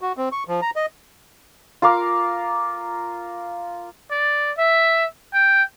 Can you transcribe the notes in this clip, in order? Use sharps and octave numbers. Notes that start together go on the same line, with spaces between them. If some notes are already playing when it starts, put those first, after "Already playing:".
F#4
C4
C#6
F3
A#5
D#5
F4 A#4 F5 D6
D5
E5
G5